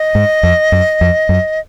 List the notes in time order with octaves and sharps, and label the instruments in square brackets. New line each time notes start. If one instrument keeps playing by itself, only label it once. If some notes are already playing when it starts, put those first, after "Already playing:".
Already playing: [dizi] D#5
[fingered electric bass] G#2
F2
F#2
F2
F#2